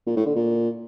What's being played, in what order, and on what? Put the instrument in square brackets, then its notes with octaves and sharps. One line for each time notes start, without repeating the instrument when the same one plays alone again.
[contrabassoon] A#2
A2
D3
A#2